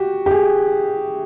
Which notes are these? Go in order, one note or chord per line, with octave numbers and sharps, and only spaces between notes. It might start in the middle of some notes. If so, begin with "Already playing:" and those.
Already playing: F#4 G4
G4
G#4